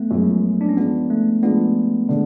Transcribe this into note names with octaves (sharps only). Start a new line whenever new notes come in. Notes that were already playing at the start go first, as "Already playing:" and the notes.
Already playing: A3 B3
F#2 F3 G#3
D4
C#4
F3 G#3 B3 D4
A3
F3 G#3 B3 D4
D3 G#3 D4